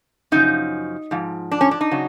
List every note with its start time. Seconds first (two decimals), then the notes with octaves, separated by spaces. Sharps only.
0.32 F#2 C#3 F3 D#4
1.11 G#2 F3
1.52 D4
1.61 C#4
1.71 D4
1.81 D#4
1.91 C#3 F#3